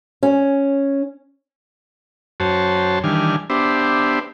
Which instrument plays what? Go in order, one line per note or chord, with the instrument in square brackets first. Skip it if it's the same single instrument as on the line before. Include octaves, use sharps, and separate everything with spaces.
[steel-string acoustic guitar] C#4
[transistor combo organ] F#2 F#4 C5 C#5 A5
D#3 E3 G3 D4 G#5 F6
B3 D4 G4 C5 E5